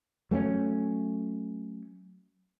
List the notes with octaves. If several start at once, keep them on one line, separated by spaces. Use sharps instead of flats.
F#3 A3 C4 C#4